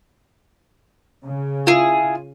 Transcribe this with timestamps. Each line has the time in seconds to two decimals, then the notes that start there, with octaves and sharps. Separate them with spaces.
1.25 C#3
1.67 E4 F4 G#4